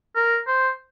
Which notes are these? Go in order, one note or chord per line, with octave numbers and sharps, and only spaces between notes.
A#4
C5